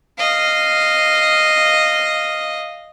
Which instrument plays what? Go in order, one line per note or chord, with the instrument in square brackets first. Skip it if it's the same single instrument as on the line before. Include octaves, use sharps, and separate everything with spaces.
[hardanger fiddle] D#5 F5